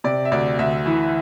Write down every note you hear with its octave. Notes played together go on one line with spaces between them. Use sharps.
C3 D5
E5
D2 D5
D2 E5
E3